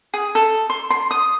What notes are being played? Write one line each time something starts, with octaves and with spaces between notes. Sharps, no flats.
G#4
A4
C6
C6
D#6